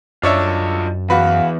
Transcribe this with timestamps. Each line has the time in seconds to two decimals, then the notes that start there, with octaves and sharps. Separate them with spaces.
0.23 F#2 D4 F4 C#5 D#5 E5
1.10 E2 F#4 B4 F5